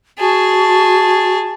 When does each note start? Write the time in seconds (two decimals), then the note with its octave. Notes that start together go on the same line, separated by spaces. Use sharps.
0.19 F#4 G#4 A5